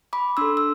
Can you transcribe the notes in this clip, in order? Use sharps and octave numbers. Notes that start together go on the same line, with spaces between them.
B5 D6
D4 A4 C6 E6
E6